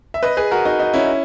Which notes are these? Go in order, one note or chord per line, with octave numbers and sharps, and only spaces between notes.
E5
B4 D#5
G#4 B4
F#4 A#4
D#4 F#4
D#4
C#4 E4